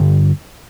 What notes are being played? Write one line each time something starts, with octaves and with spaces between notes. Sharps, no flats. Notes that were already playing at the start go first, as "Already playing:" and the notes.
Already playing: G2 D3